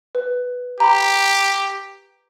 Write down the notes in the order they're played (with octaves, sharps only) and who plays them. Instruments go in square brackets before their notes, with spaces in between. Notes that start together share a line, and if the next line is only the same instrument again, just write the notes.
[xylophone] B4
[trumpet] G4 [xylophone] A#5 B5